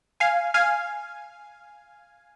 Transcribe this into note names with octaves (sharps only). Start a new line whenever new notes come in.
F5 G#5
F5 G#5